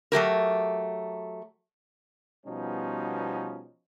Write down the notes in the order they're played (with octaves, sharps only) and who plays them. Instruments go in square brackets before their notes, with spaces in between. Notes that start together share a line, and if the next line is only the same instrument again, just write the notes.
[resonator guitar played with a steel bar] F#3 A3 G4 A#4
[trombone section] B2 F3 G3 B3 C#4 D#4